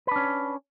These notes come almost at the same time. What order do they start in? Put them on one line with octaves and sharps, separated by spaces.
B4 D4 C#4